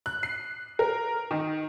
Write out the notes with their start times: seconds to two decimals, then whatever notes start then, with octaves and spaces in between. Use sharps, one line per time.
0.06 F#6
0.23 C7
0.79 A#4
1.31 D#3